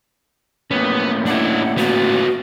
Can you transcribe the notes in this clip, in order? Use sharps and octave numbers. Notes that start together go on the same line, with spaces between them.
A2 A#3 B3 C#4
D4 E4 F#5
B3 F4 F#4